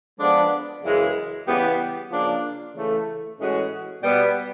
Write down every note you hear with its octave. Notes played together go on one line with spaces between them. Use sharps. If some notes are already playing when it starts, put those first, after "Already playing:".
F3 G#3 B3 D4
F#2 C#3 E3 G#3
C#3 E3 G3 B3
C#3 F3 A#3 D4 F4
C#3 E3 A3
A2 E3 G#3 C#4 F#4
B2 G3 B3